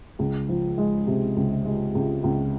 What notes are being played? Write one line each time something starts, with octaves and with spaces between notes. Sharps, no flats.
C#2
F3
G#3
C3
C#2
G#3
C#2
C#2